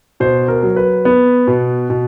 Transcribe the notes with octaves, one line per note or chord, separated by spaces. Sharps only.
B2 C5
A#4
F#3
B4
B3
B2
B2